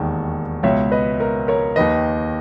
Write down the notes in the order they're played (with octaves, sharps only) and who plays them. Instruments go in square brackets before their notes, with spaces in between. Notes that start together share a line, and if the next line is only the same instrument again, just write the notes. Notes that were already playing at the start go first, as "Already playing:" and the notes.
Already playing: [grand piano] E1 D#2 D#3
C#2 B2 C#5 E5
B4 D#5
A#4
A#4 C#5
D#2 D#3 B4 D#5